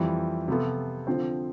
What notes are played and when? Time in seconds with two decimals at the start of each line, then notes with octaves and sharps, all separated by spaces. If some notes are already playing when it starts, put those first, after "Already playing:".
Already playing: F2 E3 G3
0.48 C3 F3 B3 F4 A4
1.07 D3 F3 C4